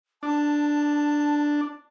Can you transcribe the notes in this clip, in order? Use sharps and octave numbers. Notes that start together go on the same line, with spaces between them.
D4 A5